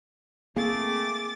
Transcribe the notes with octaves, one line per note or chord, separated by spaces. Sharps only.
A3 A#3 C4 G#4 D6 A6